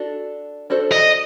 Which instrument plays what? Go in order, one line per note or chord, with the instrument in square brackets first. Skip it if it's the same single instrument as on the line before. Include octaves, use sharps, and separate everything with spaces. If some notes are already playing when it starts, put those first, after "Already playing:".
Already playing: [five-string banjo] D4 F#4 A4
D4 F#4 A4 C5
[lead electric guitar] D#5